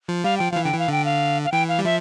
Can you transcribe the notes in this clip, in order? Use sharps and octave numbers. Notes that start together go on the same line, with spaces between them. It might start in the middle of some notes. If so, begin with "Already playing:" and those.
F3
G3 F5
F3 G5
E3 F3 F5
D3 G5
E3
F5
D3 G5
F5
F5
E3 G5
F5
G3
F3 E5